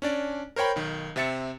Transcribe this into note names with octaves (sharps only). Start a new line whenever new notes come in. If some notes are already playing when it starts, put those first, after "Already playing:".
C#4 D4 D5
A#4 C5 C#5 G5 B5
B1 D#3
C3 C4 E5 A6 C#7